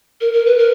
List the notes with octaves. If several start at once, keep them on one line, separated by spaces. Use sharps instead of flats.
A#4
A#4
B4
A#4